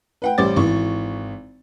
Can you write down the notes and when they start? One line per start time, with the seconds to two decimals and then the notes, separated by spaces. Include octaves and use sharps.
0.22 B4 F#5 G5
0.38 A1 G3 C5 D6 A6
0.56 G#1 E3 C#6